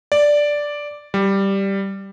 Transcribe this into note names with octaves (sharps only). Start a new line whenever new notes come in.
D5
G3